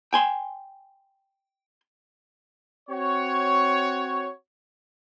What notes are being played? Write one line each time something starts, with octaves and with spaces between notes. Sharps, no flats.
G5 G#5 C6
C4 F#4 C#5